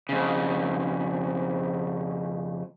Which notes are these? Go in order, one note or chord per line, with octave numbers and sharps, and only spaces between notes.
F2 C#3